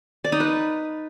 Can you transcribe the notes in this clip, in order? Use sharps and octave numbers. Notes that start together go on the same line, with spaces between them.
D5
D#4
B4